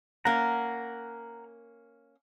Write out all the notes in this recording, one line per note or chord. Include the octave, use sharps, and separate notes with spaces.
A#3 C#4 F#5 A#5